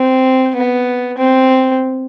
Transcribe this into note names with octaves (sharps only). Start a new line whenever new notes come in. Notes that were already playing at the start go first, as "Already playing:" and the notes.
Already playing: C4
B3
C4